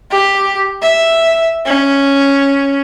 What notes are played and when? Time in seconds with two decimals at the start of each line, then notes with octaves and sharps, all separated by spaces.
0.11 G4
0.82 E5
1.65 C#4